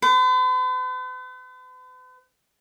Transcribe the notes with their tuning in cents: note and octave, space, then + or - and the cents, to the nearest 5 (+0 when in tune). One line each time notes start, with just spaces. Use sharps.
B4 +45